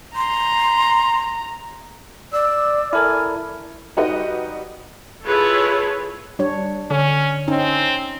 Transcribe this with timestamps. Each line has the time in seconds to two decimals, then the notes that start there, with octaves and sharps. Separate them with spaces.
0.16 A#5 C6
2.33 D5 E6
2.93 E4 A4 A#4 G#5 F6
3.97 G3 D#4 F#4 G4 B4 D#5
5.24 E4 F4 G#4 A4 B4 C#5
6.39 G3 D4 C#5
6.91 D3 C#4
7.48 C4 C#4 D#4